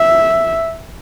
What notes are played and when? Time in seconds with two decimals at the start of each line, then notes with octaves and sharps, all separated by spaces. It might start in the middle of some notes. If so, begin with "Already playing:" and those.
Already playing: E5